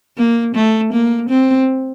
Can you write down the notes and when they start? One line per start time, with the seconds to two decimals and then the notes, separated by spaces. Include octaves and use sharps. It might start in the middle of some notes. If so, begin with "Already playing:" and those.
0.17 A#3
0.55 A3
0.93 A#3
1.29 C4